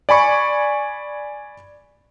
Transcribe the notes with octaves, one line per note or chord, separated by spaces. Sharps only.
D5 G#5 B5 C#6